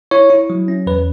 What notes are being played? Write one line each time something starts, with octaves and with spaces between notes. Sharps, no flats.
E4 C#5
E4
F#3
C#4
E2 B4